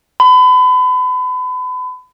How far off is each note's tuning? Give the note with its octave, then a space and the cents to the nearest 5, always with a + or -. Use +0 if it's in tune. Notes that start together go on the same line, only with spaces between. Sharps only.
B5 +35